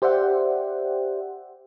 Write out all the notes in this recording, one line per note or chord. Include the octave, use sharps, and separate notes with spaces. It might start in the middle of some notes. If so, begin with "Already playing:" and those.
G4 C5 D5 E5 F#5 G5